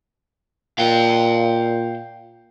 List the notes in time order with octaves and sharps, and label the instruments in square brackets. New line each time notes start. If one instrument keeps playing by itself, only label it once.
[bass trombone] A#2 [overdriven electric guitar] F5 G5